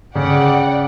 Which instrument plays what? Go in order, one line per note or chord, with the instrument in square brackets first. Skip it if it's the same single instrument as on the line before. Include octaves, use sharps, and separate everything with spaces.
[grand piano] C#3 [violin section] D5 F#5 G5